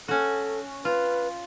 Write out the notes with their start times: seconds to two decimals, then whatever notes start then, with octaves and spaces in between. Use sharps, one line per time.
0.08 C#4 F#4 A4
0.85 F4 B4